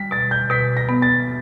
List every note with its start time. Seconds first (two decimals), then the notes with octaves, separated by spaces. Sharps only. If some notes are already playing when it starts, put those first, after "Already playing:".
Already playing: G3 B6
0.11 B2 A6
0.31 G6
0.50 B2 B6
0.77 A#6
0.89 B3
1.02 A6